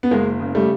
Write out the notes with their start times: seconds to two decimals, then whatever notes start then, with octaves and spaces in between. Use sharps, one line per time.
0.03 B3
0.11 F#1 G#3 A#3
0.40 C#3
0.55 G3 A3